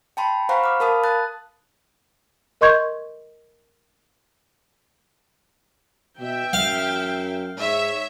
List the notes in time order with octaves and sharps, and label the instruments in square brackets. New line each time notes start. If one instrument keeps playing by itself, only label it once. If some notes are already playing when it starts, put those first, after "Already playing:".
[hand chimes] G5 A5 B5 C6
C5 F5 F#5 A#5 B5 C#6
D6 F6
A#4 F5 A5 B5 D#6
A5 F#6 A6
[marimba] A#4 D#5 C6 C#6 G6 G#6
[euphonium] B2 [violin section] E5 [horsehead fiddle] G5
[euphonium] F#2 [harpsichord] F5
[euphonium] G#2 [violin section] C#5 E5